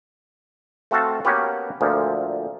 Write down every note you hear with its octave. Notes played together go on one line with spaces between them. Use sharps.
A3 C4 F#4 A4 F5 A5
A#3 B3 C#4 F#4 G4 B4
D2 A#2 F3